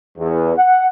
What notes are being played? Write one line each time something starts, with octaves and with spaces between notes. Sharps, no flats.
E2
F#5